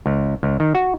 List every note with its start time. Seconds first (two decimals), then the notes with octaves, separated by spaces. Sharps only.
0.06 C#2
0.43 C#2
0.60 D#3
0.75 F#4